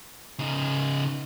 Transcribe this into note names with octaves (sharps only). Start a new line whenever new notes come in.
C#3 D#4